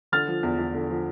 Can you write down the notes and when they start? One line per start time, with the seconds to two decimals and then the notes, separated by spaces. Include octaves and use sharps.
0.12 D3 F6 A6
0.28 F3
0.43 E2
0.59 E2
0.74 D3
0.90 F3